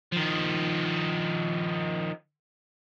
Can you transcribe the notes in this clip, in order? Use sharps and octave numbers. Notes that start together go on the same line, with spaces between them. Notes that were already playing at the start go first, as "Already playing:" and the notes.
D#3 F3